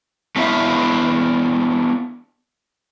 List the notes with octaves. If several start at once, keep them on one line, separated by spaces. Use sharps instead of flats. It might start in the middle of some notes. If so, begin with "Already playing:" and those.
A3 B3 D4 E4 E5 F5